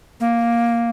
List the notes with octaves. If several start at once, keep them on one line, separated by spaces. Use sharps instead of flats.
A#3